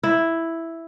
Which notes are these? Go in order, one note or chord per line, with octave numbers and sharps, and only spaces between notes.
E4